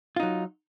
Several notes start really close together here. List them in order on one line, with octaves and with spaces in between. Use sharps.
F4 D#4 F#3